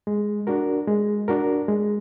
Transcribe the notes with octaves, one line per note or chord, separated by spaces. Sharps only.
G#3
D4 F#4 A#4
G#3
D4 F#4 A#4
G#3